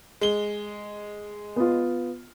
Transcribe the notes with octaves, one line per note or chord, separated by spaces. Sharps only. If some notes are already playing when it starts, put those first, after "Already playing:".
G#3 G7
B3 F4